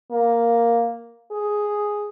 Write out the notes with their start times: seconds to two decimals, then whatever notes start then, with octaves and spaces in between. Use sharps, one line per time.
0.11 A#3
1.31 G#4